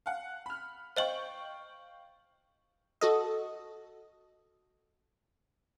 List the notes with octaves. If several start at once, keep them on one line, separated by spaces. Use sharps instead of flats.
F5 F#5
B5 F6
C5 D#5 F5 G5 C#6 F#7
F#4 A4 D#5